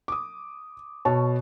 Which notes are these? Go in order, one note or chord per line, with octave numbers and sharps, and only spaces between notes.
D6 D#6
B2 C#5 A5